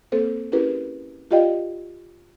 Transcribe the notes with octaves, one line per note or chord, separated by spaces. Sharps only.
A#3 C4 A4 C5
C#4 E4 G4 G#4 A#4 B4
F4 G4 D5 D#5 F5 G5